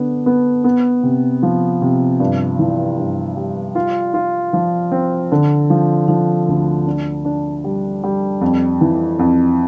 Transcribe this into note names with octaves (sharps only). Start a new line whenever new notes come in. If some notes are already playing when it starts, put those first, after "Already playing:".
Already playing: D3 B3 D4
B3
B3
C3
F3
C3
G2
E3
G2
G3
F4
F4
F3
C4
D3
F3
F3
D2
D4
D4
G3
G3
F2
E3
F2